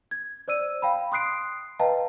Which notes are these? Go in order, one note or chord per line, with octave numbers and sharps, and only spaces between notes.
G#6
C5 D5 E6 D#7
F5 G5 A5 B5
C6 D#6 F#6 C7 D7
B4 D#5 F5 G5 A5 A#5